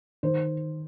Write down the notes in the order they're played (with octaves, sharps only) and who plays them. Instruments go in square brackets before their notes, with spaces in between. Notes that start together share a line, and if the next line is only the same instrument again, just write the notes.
[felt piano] D#3 C5